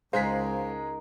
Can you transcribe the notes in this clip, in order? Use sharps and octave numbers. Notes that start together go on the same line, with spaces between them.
C#2 G#3 D#4 G#4 A#4 C5 F5 B6